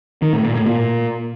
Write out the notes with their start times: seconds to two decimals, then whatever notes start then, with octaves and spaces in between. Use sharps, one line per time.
0.22 D#3
0.33 A2
0.44 A#2
0.55 A2
0.66 A#2